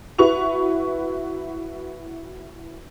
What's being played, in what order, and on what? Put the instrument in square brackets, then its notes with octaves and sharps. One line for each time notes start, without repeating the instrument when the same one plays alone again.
[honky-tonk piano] E4 F#4 B4 C#6 F7